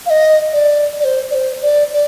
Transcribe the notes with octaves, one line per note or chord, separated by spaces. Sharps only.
F5
D#5
D5
D5
C5
D5
C5
D5
D5